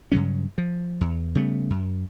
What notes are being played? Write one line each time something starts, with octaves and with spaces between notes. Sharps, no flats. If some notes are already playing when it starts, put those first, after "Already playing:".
G2 C#3 F#3 C#4
F3
E2
C#3 G3 A3 B3
F#2